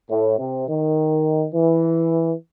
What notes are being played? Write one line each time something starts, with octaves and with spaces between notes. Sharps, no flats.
A2
C3
D#3
E3